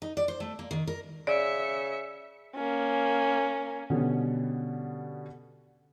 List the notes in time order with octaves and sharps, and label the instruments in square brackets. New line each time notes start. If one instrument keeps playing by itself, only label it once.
[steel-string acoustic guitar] D#4
D5
C5
A3
A#3
D#3
A#4
[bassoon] C#3 [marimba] D5 [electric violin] E5 C#7
[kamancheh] A#3 C#4
[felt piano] B2 D3 G3 B3 C#4